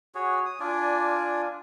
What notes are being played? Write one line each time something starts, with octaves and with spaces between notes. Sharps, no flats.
F#4 G#4 C#5
D#6
D4 F4 D5 G#5